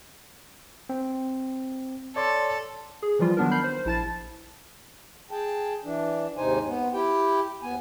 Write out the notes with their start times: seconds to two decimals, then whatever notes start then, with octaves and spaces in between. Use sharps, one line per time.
0.89 C4
2.16 A4 C#5 D5 C6
3.02 G#4
3.19 E3 F3 G3 F4
3.37 D#3 F#3 B3 D4 D#4 A#4
3.51 B5 F6 G6 C7
3.64 C5
3.85 A#1 E4 A5 A6
5.31 G#4 G5 A5
5.84 E3 D4
6.37 D#2 G#2 C3 D#4 C5 G#5
6.68 B3
6.93 E4 G4 G5
7.63 D#2 B3 G#5